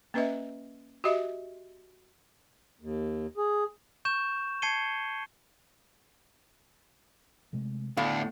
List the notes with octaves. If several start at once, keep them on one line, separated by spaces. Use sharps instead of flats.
A#3 C#4 B4 D#5 E5
F#4 G4 D#5 E5
D#2
G#4
C#6 G6 E7
A5 G#6 C7 C#7 D#7 G7
C3 G#3 A3
D2 A2 B3 D4 F5